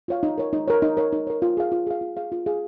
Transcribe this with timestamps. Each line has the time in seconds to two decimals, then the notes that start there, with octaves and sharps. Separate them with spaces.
0.08 F4 C#5 F5
0.23 D#4
0.38 A#4 C#5
0.53 D#4
0.68 A#4 C#5
0.82 D#4
0.97 A#4 C#5
1.12 D#4
1.27 A#4 C#5
1.42 F4
1.57 G#4 F5
1.72 F4
1.87 G#4 F5
2.01 F4
2.17 G#4 F5
2.32 F4
2.46 G#4 F5